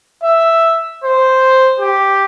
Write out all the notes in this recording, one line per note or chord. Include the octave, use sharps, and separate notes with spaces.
E5
C5
G4